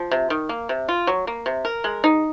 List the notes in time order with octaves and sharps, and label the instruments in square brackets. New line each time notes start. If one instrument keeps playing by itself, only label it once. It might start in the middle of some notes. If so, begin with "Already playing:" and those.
Already playing: [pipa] F3
C3
D#3
A#3
C3
F4
F#3
A#3
C3
A#4
G#3
D#4